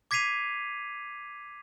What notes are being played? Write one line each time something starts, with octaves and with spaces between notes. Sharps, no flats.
D6 G#6 B6 C7 D#7 F7